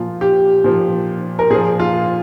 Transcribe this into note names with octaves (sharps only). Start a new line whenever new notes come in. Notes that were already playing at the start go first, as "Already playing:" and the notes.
Already playing: A#2 F3 F4
G4
A#2 F3
A#4
A#2 F3 G#4
F4